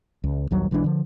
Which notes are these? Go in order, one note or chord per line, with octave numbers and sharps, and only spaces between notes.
C#2
A#1 D#2 F#3 G3
B1 E3 G#3 D4
D3 F3